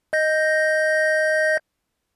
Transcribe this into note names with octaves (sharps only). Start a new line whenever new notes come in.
D#5 G6 A#6